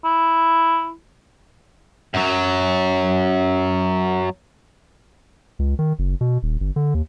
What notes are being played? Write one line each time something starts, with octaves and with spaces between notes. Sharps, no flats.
E4
F#2 F#3
C#2
D#3
F#1
B2
D#1
G1
D3
D#2